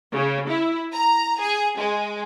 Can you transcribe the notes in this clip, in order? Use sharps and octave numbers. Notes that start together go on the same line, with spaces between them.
C#3
E4
A#5
G#4
G#3